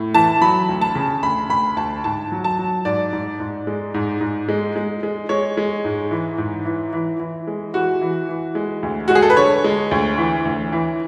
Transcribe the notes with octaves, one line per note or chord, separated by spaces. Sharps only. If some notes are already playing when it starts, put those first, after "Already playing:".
Already playing: A2
E3 A5
F#3 B5
D2
A5
C#3
D2 B5
D2 B5
D2 A5
G#2 A5
F#3
A5
F#3
G#2 D5
G#2
G#2
G#3
G#2
G#2
G#3
G#3
G#3
G#3 C#5
G#3
G#2
E3
G#2
E3
E3
E3
G#3
E3 F#4
E3
E3
G#3
D2
G#3 F#4
G#4
A4
B4
D3 C#5
G#3
D2
E3
D2
E3